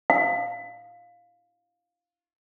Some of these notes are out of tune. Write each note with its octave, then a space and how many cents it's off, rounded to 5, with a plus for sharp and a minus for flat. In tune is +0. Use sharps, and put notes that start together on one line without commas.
F5 +10